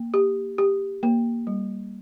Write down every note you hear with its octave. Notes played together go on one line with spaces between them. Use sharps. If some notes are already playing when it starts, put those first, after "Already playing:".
Already playing: A#3
G4
G4
A#3
G3